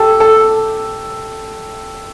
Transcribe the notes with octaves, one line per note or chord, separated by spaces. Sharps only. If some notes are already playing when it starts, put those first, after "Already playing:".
Already playing: G4 A4
A4